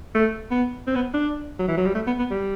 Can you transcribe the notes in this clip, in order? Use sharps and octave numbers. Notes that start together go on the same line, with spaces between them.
A3
B3
C4
B3
D4
F#3
E3
F#3
G3
A3
B3
B3
G3